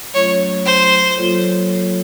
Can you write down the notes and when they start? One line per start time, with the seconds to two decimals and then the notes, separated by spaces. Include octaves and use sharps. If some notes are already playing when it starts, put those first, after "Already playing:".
0.14 F#3 A3 C#4 F4 C#5
0.65 C5
1.16 F#3 A#3 F4 A4 C#5